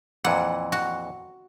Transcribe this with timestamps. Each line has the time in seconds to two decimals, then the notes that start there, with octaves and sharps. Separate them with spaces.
0.24 F2 A#2 E3 F#5
0.72 F#4